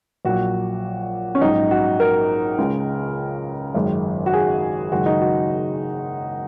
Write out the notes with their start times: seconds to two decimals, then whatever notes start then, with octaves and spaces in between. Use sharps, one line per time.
0.25 A#1 A#2 F#3 F#4
1.35 C#4
1.41 A#1 G#2 F#3 D#4
1.71 F#4
2.00 A#4
2.58 C#2 C#3 G#3
3.75 G#1 F#2 D#3 G#3
4.26 F#4
4.33 G#4
4.92 F#1 F#2 D#3 G#3 F#4
5.06 D#4
5.21 F#4